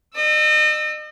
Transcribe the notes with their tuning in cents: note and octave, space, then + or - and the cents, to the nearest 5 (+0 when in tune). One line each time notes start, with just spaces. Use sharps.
D#5 -40 E6 +0